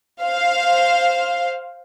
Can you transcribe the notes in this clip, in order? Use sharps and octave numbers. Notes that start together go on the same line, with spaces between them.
C5 F5